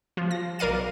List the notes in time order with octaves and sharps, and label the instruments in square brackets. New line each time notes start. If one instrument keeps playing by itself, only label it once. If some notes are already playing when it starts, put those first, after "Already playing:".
[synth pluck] F3 F4
A#6
B1 A#4 D5 F5 D#7